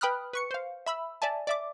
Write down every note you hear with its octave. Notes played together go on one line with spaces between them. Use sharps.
B4 G5 B5 D#6 F6 F#6
B4 C#6 C#7
C5 F5
E5 B5 E6
D5 E5 G#5 A5
D5 E5 D6